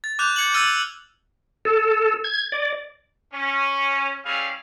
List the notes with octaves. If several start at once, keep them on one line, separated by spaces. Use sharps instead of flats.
A6
D6 F#6 G6 F7
G#6 C#7 F#7
E6 F6 A6 D#7
A4
G#6
D5
C#4
G3 C#4 E4 G#4 F5